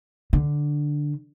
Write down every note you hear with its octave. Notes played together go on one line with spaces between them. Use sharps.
D3